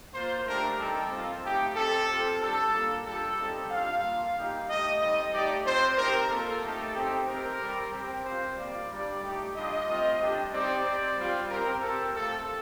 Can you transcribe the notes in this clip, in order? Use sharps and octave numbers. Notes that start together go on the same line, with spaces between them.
A#3 F4 C5
A3 D4 G4 A#4
G3 C4 D#4 G4 A4
C4 F4
A3 D#4 G4
C4 G4 A4
C4 F4
G3 D4 G4 A4
A#3 D4 F4
G3 D4 F4 A4
G3 C4 D#4 G4
G3 D4 F4 F5
A#3 F4
G3 A#3 D#4 G4
A3 D#4 G4 D#5
G3 C4 D#4 D#5
A3 D#4 G4 D5
C4 F4 C5
C4 D#4 G4 A#4
A#3 F4 A4
A3 D#4 G4
C4 D#4 G4
C4 G4 A#4
G3 C4 G4
C4 G4
C4 F4 C5
G3 A#3 F4 D5
G3 D4 G4
A3 D#4 G4
G3 D4 F4 D#5
A3 C4 F4
G3 D4 G4
C4 D#4 G4 D5
C4 G4
G3 C4 F4
C4 G4 A#4
C4 G4 A4
A3 C4 F4 A4